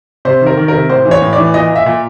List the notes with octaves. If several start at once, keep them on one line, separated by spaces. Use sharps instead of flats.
C3 C5
D#3
A#4
D#3
A#4
C3
A2 C5
E3
C#5
A2
D5
E3
A#2 D#5
A#2
E5
A#2